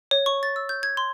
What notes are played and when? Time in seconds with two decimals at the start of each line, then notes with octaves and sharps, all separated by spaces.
0.11 C#5
0.26 C#6
0.43 A6
0.56 E6
0.69 G6
0.83 G#6
0.97 C6